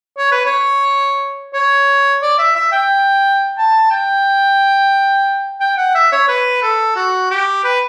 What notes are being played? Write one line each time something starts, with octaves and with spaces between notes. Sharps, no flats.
C#5
B4
C#5
C#5
D5
E5
E5
G5
A5
G5
G5
F#5
E5
C#5
B4
A4
F#4
G4
B4